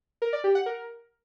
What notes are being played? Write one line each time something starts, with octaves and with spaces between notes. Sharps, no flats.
A#4
D5
G4
F#5
A#4